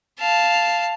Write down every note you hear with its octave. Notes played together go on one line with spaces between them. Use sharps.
F5 A5